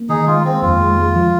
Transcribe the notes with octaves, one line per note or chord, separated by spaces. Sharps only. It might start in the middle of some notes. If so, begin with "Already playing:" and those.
Already playing: A#3
D#3 D#4 G#4
G#3 F4
G#3 C4
F2 F4
G#3
G#3
F3